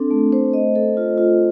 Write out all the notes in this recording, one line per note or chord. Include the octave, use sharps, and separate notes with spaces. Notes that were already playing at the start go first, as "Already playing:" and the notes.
Already playing: C4 D4 A4
A3
C5
D#5
A4
F4
F4